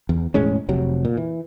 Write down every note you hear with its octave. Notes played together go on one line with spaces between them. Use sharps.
E2
E1 A2 G#3 C#4
F1 C3 F#3
A#2
E3